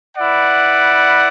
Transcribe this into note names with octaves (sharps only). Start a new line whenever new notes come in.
E4 B4 D5 F#5